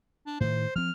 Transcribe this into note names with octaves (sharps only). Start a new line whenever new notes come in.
D4
A2 D#3 C5
F3 C4 F6